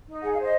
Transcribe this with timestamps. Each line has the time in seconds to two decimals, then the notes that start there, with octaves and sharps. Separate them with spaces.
0.08 D#4
0.22 G#4 F#5
0.33 F5
0.38 C5 D#5